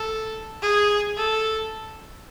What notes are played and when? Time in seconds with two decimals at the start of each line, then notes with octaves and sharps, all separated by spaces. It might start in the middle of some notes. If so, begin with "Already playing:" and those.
Already playing: A4
0.62 G#4
1.17 A4